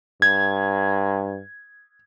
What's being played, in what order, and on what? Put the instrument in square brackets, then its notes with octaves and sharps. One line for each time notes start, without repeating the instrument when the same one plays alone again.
[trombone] G2 [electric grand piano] G#6